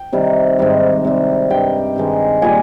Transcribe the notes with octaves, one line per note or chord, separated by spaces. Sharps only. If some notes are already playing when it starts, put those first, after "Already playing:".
Already playing: G5
C3 D#3 G3
G#2 D#3 G3
C3 G3
G2 D#3 G3 G5
G2 D#3 G#3
A#2 G3 G#5